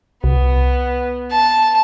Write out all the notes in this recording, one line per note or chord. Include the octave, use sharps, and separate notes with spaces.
C2 B3
A5